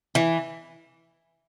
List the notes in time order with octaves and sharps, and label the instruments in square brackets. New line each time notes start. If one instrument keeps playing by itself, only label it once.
[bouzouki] E3